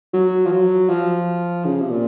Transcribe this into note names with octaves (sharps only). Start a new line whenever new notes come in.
F#3
F3
F#3
F3
C#3
C3
A#2